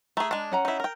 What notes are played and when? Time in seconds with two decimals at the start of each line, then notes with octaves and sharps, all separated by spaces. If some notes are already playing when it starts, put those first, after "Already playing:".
0.17 A3 G#4 A#5
0.31 G#3 D4
0.52 C#4 F#5 A#5
0.65 D#4 E4
0.80 A#4 G5